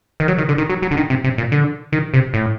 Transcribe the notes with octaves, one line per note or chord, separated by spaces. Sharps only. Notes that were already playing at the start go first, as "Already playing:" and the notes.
D#3
F#3
D#3
D3
D#3
F#3
F#3
D3
D#3
C3
C3
A#2
D3
D#3
C3
A2